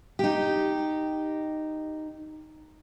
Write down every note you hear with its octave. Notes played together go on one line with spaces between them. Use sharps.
D#4 G4